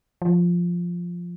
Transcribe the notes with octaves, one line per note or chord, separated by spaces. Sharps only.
F3